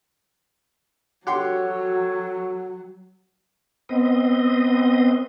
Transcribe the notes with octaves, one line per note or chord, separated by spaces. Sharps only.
F#3 F#4 G4 A4 C#5 F#5 C6
B3 C4 D#5